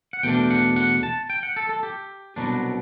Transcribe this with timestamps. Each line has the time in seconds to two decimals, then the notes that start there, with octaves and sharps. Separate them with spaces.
0.13 F#5
0.23 E2 B2 A3 D4 G5
0.50 F#5
0.76 F#5
1.03 A5
1.30 G5
1.43 F#5
1.56 A4
1.69 A4
1.83 G4
2.36 C2 B2 F#3 B3 D4